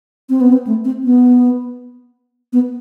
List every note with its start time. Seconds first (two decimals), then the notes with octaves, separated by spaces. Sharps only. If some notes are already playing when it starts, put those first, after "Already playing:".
0.30 C4
0.41 B3
0.53 C4
0.67 A3
0.85 C4
1.04 B3
2.53 B3